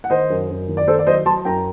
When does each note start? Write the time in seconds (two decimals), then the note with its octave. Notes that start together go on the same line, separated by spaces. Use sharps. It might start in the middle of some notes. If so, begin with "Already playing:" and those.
0.04 F#5
0.10 D#3 C5 D#5
0.30 F#2
0.50 F#2
0.68 D#3
0.77 D5
0.87 D#3 A4 C5
0.99 D5
1.06 F#3 C5 D#5
1.26 F#3 A5 C6
1.45 F#2 G5 A#5